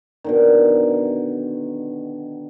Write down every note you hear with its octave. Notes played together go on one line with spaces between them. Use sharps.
B2 D3 D#3